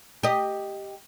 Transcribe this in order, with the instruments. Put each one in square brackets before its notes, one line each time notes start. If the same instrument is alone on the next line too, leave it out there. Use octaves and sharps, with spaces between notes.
[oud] G4 D#5